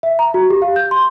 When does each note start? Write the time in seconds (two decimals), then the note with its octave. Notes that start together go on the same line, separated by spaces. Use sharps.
0.03 E5
0.19 A#5
0.34 F#4
0.50 G4
0.62 F5
0.76 G6
0.91 C6